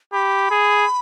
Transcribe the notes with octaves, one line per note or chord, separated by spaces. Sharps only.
G4 B5
G#4